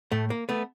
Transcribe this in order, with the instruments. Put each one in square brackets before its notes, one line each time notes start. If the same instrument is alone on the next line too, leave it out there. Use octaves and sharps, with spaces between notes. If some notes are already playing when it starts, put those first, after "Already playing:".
[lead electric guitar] A2 [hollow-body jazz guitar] A3
[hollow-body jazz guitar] A#3
A3 B3